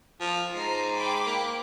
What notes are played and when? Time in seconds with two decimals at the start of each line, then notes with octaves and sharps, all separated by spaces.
0.21 F3
0.55 G#2 A#5 C7
0.95 G5 B5 D6
1.26 A#3